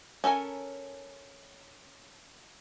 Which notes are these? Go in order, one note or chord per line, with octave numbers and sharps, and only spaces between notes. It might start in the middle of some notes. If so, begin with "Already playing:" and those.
C#4 A4 A#4 G#5